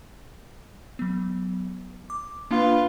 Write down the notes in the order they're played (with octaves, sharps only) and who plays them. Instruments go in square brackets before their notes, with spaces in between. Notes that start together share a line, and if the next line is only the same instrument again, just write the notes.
[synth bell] F#3 B3
D6
[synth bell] A#3 D4 [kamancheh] F4 B4